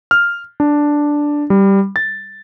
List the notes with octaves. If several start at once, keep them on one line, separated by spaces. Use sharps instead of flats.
F6
D4
G3
A6